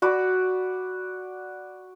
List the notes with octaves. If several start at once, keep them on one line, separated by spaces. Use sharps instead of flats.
F#4 D5 B5